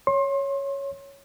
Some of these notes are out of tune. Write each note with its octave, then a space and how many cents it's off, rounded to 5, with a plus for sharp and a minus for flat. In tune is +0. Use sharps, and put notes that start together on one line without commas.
C#5 +0 C6 +30